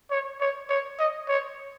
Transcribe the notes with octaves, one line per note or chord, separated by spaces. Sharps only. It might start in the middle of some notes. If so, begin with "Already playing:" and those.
C#5
C#5
C#5
D#5
C#5